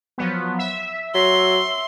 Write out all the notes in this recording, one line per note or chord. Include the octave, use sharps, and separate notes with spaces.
F3 F#3 B3
E5
F#3 C6